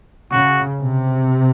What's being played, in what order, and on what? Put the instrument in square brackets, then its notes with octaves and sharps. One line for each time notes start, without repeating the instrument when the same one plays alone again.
[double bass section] C#3 [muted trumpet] F#4
[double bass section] C3